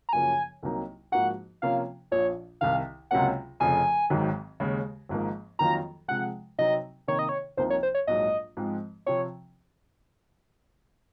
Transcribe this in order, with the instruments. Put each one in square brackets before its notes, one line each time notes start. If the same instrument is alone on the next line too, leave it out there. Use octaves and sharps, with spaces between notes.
[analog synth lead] A#5
[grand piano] F#2 C#3 F3 A#3 C#4 [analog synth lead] G#5
[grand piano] C2 C3 F#3 A#3 D#4
[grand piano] G#2 F3 A#3 D#4 F#4 [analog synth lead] F#5
[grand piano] C3 F3 A#3 C#4 F4 [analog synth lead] F5
[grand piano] A#1 A#2 F3 [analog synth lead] C#5
[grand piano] C2 C3 D#3 [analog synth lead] F5
[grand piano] C#2 C3 F#3 A#3 C#4 [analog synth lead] F#5
[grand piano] F1 F2 C#3 F3 [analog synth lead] G#5
[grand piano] G#1 G#2 D#3 F#3
D#2 C#3 G#3
G#1 G#2 F3 A#3
[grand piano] F2 D#3 F#3 A#3 F4 [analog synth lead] A#5
[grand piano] C3 F3 G#3 [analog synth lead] F#5
[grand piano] C3 F#3 C4 D#4 [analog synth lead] D#5
[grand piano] C3 D#3 A#3 D#4 [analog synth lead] C#5
[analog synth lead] D#5
C#5
[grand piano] C2 C3 F3 A#3 D#4 [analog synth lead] C5
[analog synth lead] C#5
C5
C#5
[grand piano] A#1 G#2 F#3 [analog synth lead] D#5
[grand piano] G#2 F3 G#3 C4
[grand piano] C3 F3 C4 [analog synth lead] C#5